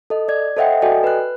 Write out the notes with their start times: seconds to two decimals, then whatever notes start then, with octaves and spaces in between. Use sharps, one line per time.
0.10 A4 D#5
0.28 D5 G#6
0.57 A4 C5 D#5 E5 F#5 G5
0.82 F#4 A4 D5 D#5 G5 G#5
1.04 B4 F#6